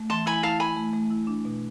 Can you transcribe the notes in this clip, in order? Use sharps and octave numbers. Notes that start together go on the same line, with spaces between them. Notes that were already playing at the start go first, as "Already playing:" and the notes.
Already playing: A3
E3 A5 C6
E4 G#5 B5
E4 F5 A5
E4 G#5 B5
A3
A3
E4
D4
B2